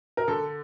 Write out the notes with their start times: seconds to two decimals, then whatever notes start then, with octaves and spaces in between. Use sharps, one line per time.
0.17 A#4
0.28 D3 A4